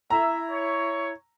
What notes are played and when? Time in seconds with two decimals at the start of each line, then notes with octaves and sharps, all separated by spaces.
0.10 E4 E5 A#5
0.50 C#5